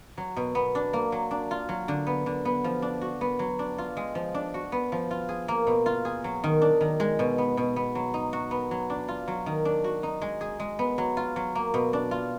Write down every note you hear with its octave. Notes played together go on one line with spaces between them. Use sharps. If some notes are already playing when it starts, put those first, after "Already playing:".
F#3
B2
B3
D4
A#3
F#3
D4
F4
F#3
D3
B3
D3
B3
F3
D4
F#4
B3
F#3
D4
F4
G#3
F3
D4
F#4
B3
F3
F4
G#4
A#3
B2
F4
G#4
F#3
D#3
D4
D#3
G#3
B2
B3
B2
B3
F#3
D#4
F#4
B3
F#3
D4
F4
F#3
D#3
D4
F#4
D#4
G#3
G#4
G#3
B3
F#3
F4
F#3
A#3
B2
D4
F4